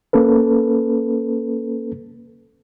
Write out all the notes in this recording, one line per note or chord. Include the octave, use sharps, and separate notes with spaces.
A#3 C#4 A4 B4